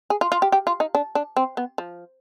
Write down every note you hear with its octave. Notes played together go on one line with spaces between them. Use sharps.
G#4
F4
F4
G4
G4
F4
D#4
D4
D4
C4
B3
F3